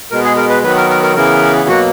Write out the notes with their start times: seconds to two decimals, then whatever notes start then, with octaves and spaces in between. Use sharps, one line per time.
0.11 B2 G#3 B3 A#4
0.24 G#4
0.37 A#4
0.50 B4
0.63 D#3 F#3 B3 B4
0.77 A#4
0.90 A#4
1.03 A#4
1.16 C#3 E3 B3 A#4
1.68 B2 F#3 A#3 F#4